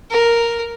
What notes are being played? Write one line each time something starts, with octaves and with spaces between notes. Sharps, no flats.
A#4